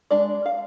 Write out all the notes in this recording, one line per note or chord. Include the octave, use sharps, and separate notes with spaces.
G#3 D4 D5
F5